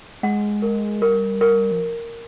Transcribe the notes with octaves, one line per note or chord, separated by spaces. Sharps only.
G#3 F#5
A#4
G3 A#4
A#4
F3